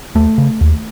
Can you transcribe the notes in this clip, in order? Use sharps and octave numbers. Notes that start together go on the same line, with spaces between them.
D#2 A3
C#3
D#2